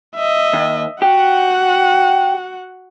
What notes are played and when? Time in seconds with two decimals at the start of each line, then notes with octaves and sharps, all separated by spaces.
0.15 D#5 E5
0.53 D#2
1.02 F#4 G4 F#5